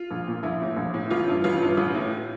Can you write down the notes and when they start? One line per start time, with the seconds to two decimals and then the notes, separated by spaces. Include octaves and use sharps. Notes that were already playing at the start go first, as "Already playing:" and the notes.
Already playing: F4
0.11 A#1
0.27 A#2
0.43 A#1 E4
0.61 A2 E3
0.77 A#1
0.94 A2 E3
1.11 A1 F4
1.28 G2 E3
1.44 A1 F4
1.62 G2 E3
1.77 A1
1.95 A2 E3